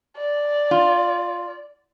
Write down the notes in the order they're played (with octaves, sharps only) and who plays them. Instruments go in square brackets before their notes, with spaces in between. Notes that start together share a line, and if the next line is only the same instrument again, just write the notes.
[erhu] D5
[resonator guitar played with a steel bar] F4